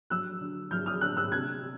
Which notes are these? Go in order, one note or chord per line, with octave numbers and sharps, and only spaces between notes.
F#3 E6 F#6
D3
F#3 F6 G6
D#6 F6
D3 E6 F#6
E6 F#6
C3 F#6 G#6